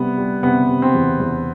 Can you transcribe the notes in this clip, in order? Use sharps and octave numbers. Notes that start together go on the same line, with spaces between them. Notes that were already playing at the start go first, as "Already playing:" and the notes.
Already playing: C3 G3 B3
G3
C3 B3
C3
C4
E2
E2